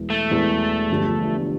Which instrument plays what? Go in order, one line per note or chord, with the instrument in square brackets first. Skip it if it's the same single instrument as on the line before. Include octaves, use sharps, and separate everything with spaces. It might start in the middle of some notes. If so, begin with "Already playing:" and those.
Already playing: [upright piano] E1 E2 E3
[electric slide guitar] A3
[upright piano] E1 E2 E3
G1 G2 F3